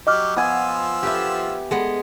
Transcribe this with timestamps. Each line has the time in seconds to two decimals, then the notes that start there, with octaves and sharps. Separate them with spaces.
0.07 F#3 G4 D#5 D6 F6
0.36 F3 B3 F4 G#5 E6
1.03 G4 B4 E5
1.71 G#3 B3